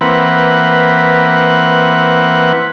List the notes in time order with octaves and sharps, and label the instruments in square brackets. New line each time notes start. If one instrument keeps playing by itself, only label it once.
[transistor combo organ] E3 A#3 C4 B4 F#5